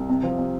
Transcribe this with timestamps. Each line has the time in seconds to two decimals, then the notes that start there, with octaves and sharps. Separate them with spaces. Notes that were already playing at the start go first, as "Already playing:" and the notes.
Already playing: C2
0.09 C3
0.23 F3
0.38 C3